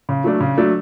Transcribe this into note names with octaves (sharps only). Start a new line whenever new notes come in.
C#3
F#3 A3 D4
C#3
F#3 A3 D4